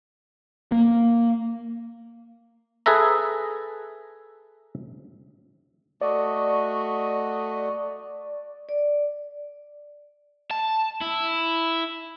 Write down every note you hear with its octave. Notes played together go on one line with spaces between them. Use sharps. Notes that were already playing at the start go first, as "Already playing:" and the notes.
A#3
G#4 A4 B4 E5 A#5
A3 F#4 D5 D#5
D5
A5
E4